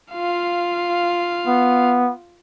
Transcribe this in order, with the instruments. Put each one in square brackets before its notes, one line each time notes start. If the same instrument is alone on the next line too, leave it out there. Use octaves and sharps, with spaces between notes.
[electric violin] F4 F5
[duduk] B3